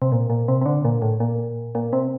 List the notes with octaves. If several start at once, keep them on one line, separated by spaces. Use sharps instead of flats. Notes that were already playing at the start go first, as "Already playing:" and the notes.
C3
A#2
A#2
C3
C3
D3
A#2
A2
A#2
A#2
C3